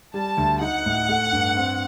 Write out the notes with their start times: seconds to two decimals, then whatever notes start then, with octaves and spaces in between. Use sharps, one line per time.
0.14 G3 A5
0.38 D2
0.61 D#4 F#5
0.86 A2
1.09 A3
1.32 G2
1.57 C4